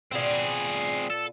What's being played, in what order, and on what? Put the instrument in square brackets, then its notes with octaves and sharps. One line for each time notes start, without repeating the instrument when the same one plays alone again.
[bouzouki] B2 F4 D5 [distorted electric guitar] C4 G#4
[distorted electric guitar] A4